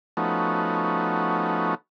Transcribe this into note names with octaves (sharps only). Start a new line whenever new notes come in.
F3 A3 B3 C#4 D#4 F#4